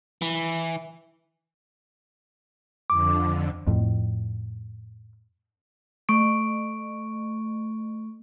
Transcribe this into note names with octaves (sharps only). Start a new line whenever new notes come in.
E3
F2 D3 D6
F2 A2
A3 C#6 D7